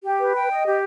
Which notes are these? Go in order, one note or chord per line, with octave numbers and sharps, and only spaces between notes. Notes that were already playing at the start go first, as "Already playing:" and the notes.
G4
B4
G5
D#5
G4